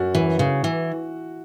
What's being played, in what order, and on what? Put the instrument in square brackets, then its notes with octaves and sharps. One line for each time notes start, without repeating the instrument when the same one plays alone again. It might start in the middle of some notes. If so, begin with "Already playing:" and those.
Already playing: [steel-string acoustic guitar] F#2 [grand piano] F#4
[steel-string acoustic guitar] E3
C#3
E3